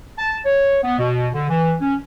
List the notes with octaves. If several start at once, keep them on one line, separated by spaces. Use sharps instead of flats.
A5
C#5
B3
B2
D3
E3
C#4